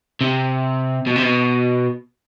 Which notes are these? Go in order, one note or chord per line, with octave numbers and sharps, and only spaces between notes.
C3
B2
C3
B2